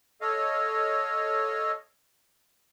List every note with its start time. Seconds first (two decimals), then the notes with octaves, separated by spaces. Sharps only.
0.21 A4 C#5 D#5 F5